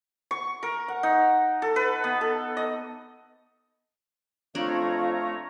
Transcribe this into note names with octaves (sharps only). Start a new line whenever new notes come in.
C#6
A#4
F#5
D#4
A4
B4
B3
A4
D#5
F2 A3 D4 F4 C#5 A#5